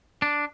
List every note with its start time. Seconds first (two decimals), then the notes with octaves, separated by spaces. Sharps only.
0.22 D4